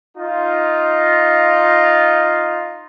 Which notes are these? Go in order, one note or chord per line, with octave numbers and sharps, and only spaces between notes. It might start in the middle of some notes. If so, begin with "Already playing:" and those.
D#4 F4